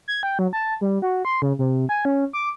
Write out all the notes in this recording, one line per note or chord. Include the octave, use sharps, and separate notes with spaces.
G#6
G5
F#3
A5
G3
F#4
C6
C#3
C3
G#5
C#4
D6